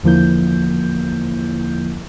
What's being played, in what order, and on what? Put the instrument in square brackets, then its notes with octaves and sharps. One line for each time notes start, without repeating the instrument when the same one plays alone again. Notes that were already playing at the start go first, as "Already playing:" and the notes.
[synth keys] E2 D3 F3 A#3 E4 G6